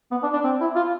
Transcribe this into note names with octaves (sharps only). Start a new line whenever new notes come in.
B3
D4
D4
C4
E4
F4